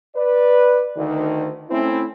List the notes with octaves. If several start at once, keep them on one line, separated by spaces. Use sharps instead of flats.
B4 D5
D2 D#3
A3 C4 C#4 E4